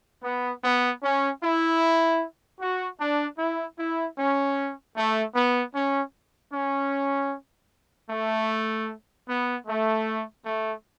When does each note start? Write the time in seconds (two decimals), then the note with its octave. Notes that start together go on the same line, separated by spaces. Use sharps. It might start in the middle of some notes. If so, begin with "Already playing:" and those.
0.23 B3
0.63 B3
1.02 C#4
1.41 E4
2.59 F#4
2.98 D4
3.37 E4
3.77 E4
4.16 C#4
4.95 A3
5.34 B3
5.73 C#4
6.52 C#4
8.09 A3
9.27 B3
9.66 A3
10.44 A3